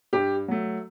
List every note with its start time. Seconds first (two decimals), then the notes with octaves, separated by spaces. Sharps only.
0.13 G2 G4
0.48 F#3 A3